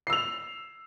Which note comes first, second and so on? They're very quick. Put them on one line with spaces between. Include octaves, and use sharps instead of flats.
C7 E6 F7